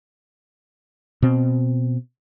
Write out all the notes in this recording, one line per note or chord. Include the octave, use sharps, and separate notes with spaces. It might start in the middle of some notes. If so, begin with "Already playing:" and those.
B2 C4